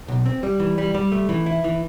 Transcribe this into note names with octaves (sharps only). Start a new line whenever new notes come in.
B1
C4
G3
E3
G3
G3
A3
E3
E4
E3